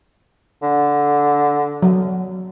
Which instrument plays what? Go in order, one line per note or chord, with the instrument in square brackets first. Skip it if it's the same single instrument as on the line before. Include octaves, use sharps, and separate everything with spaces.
[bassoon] D3
[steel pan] F#3